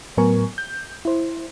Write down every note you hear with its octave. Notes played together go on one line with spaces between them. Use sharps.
A2 F#3 B3 A#4 G#5 C#6
G6
E4 C5